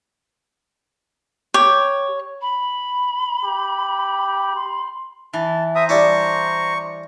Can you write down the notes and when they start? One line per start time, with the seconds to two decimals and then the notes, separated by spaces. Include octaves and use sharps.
1.54 G4 C#5
2.41 B5
3.44 G4
4.55 C6
5.33 E3 A5
5.75 C5 E5 A#5 D#6
5.89 G3 D4 E4 C#6